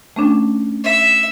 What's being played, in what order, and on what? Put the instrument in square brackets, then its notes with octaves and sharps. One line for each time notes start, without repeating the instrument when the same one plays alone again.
[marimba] A3 C#4 D4
[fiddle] E5